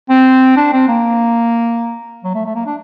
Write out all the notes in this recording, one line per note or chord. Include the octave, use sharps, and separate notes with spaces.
C4
D4
C4
A#3
F#3
A3
A3
A#3
D4